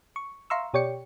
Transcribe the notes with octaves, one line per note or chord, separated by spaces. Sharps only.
C#6
E5 F5 A#5 C6 C#6 E6
B2 G4 C#5 D5 G5 C#7